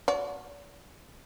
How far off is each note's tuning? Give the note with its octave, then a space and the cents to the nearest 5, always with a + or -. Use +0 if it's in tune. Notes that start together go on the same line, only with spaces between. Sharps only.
F#4 -20 D5 -45